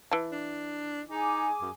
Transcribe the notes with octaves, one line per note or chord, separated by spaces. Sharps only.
E3 A5
D4
D#4 G#4 G#5 D6
F#2